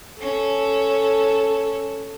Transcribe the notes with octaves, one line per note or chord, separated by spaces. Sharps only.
C#4 A4